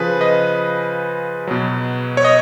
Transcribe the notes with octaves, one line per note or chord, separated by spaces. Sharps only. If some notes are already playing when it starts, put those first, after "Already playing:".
Already playing: C#3 F3 G#4 B4
B4 D#5
B2 F#3
C#5
D#5